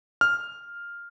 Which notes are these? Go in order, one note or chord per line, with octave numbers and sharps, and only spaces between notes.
F6